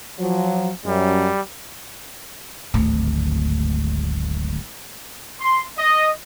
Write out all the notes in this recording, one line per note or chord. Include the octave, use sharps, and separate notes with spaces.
F3 F#3
F#2 G3
D1 G#1 D2
C6
D#5